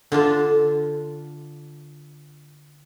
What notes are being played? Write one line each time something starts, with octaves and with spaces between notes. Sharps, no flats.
D3 D4 F4 A5